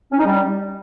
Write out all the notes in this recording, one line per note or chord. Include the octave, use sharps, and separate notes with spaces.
C#4
D#4
G3